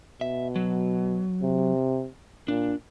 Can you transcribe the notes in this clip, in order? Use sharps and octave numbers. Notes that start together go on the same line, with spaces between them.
B2 E5
F#3
C3
A#2 D4